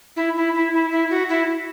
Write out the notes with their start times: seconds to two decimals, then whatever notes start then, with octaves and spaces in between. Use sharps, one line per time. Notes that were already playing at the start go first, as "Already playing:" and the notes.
0.16 E4
0.36 E4
0.54 E4
0.73 E4
0.91 E4
1.10 F#4
1.29 E4